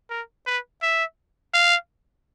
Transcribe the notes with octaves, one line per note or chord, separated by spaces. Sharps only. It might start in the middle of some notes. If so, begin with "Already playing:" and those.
A#4
B4
E5
F5